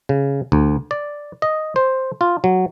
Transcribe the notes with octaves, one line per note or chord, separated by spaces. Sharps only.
C#3
D2
D5
D#5
C5
F4
F#3